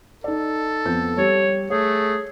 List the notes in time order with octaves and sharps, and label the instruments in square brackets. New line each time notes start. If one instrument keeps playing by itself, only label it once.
[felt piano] D#4 D5 [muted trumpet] A4
[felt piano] F2 B3 G6
[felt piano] G3 [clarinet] C#5
[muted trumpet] A3 [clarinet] G#4 [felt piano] C#5